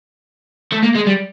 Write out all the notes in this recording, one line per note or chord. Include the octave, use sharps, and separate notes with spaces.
A3
A#3
G#3
G3